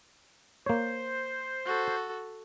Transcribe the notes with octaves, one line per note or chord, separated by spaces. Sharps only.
A#3 C5 C#5
F#4 A4